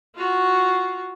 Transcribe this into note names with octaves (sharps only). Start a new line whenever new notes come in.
F4 F#4